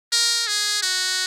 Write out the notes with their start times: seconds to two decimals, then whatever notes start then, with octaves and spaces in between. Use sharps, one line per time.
0.12 A#4
0.47 G#4
0.82 F#4